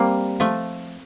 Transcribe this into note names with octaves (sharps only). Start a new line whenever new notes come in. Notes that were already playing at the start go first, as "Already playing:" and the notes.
Already playing: G3 A#3 C4
F3 A3